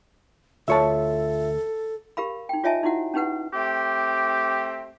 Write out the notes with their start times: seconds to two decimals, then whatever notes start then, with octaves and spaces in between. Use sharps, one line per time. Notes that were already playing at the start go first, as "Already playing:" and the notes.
0.68 D2 F4 A4 C#5 E5 A5
2.17 G4 A#4 F5 B5
2.49 D#4 G5
2.64 F4 C#5 D#5 E5 G#5 A5
2.83 D#4 E4 F#4 F#5
3.14 C#4 D#4 G4 B4 F#5
3.53 A3 C4 G4